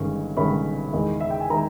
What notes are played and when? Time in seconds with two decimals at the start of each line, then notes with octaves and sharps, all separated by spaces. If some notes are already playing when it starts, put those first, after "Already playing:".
Already playing: G1 G2 D#3 G#3 C#4
0.37 G1 G2 D#3 G#3 C#4 B5
0.93 E2 D#3 G#3 D#4
1.20 E5
1.30 G5
1.40 G#5
1.50 D#3 G#3 D#4 A#5